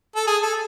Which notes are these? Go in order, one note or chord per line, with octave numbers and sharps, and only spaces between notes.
A4
G#4
A4